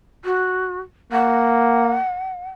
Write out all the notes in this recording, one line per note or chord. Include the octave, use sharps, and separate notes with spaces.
F#4
A#3 F#5